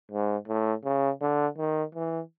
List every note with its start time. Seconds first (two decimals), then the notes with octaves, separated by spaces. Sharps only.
0.11 G#2
0.48 A2
0.85 C#3
1.21 D3
1.58 D#3
1.95 E3